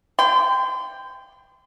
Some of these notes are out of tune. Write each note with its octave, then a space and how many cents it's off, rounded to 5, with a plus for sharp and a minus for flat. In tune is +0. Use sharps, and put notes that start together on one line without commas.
G5 +10 C6 -35